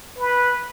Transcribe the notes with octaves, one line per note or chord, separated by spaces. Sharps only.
B4